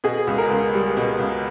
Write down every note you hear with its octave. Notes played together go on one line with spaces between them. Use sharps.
B2 G#4
C#2
A#4
C#2
G3
B2
C#2